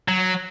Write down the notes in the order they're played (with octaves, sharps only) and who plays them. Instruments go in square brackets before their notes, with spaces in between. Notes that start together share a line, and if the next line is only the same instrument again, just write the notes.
[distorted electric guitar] F#3